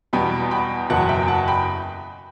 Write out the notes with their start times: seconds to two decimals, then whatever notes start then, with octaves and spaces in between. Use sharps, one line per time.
0.13 E2 B2 G3 B3 G5 B5
0.51 G5 B5
0.90 F#1 E2 B2 F#3 F#5 A5
1.09 E5 G5
1.28 F#5 A5
1.48 G5 B5